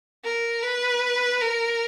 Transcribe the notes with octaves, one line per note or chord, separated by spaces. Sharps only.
A#4
B4
A#4